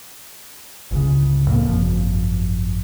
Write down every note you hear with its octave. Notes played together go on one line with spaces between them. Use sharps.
G1 C#2 C#3
F2 A2 C#3 A#3
G#1 F#2 F3